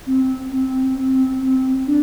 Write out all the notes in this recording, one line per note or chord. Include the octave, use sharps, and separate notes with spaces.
C4
C4
C4
C4
D4